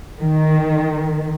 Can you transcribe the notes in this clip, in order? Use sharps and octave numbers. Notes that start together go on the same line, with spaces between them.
D#3